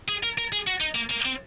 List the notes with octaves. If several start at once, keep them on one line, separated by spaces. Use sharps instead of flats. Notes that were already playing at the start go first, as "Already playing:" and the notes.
G#4
A#4
A#4
G#4
F#4
D#4
A#3
A#3
C4